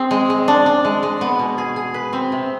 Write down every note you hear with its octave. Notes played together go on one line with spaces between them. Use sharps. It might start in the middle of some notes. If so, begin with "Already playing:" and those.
Already playing: C4 G#4
G#3
G#3
D4
D4
G#3
G#3
B3
B2
G#4
G#4
B4
C4
C3